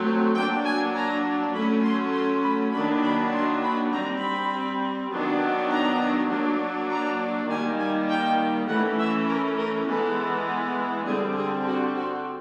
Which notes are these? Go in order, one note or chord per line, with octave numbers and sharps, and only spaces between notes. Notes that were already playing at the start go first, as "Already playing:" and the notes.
Already playing: F#3 A3 C4
F#3 A#3 D4 G5
G#5
A#5
F#3 A3 C#4 B5
C6
C6
B5
D#3 F#3 A#3 D4 B5
B5
C6
B5
G3 C4 A#5
B5
D#3 F#3 B3 D4
A#5
F#3 A#3 D4
A#5
D#3 G3 A#3 G#5
G#5
G5
E3 A3 C#4 F#5
E5
A#4
A#4
E3 G#3 B3 A4
D3 G3 C4 G#4
G#4
F#4
F#4